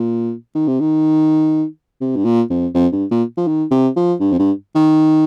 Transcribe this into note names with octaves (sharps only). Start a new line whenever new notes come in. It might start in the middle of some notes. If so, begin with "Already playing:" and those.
Already playing: A#2
D#3
C3
D#3
C3
G2
A#2
F2
F2
G2
A#2
F3
D#3
C3
F3
G2
F2
G2
D#3